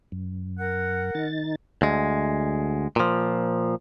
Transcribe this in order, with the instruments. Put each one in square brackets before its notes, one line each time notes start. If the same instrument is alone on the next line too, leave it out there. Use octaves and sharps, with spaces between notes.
[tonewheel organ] F#2
[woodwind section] A#4 F#5
[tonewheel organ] D#3 D#4 A6
[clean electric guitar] D2 G#3
A#2 F3